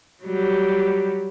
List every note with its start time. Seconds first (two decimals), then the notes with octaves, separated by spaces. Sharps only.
0.24 F#3 G3